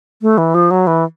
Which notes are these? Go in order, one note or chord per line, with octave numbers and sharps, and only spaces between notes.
A3
E3
F3
F#3
E3